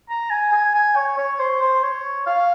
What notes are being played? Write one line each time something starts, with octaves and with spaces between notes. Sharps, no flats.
A#5
G#5
G#5
G#5
C#5
C#5
C5
C5
C#5
F5